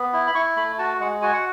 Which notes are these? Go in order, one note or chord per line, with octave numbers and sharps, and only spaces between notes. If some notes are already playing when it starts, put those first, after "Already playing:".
Already playing: B3
E4
B5
E4 C#6
A3 B5
F#4 A5
G#3 F#5
F#4 G#5
F#5